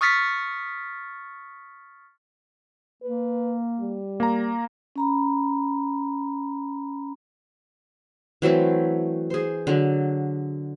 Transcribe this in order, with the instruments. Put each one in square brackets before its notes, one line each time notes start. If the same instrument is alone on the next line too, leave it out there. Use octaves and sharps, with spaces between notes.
[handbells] C#6 D#6 F6 A6 B6 C#7
[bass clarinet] A#3 [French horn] B4
[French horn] G3
[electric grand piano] A#3 A#5
[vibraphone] C#4 A#5 B5
[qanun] E3 F#3 A3 C4
G#4 C5
D3 F#3